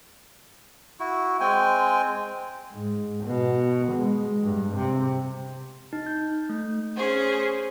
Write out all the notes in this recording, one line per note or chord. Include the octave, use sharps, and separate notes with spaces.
E4 F#4
G#3 C4 G5 G#5
G#2
B2
G#3
G2
C3
D#4
G6
A3
C#4 G#4 C5